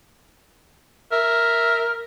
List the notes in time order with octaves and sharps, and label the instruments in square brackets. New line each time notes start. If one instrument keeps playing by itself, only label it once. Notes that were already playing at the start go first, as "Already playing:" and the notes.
[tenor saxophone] A#4 [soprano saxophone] E5